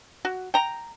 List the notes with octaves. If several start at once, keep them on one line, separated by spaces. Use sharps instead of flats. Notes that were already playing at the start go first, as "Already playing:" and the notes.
F#4
G5 A#5